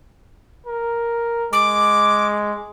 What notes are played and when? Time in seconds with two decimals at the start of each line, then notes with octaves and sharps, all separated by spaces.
0.66 A#4
1.53 G#3 D6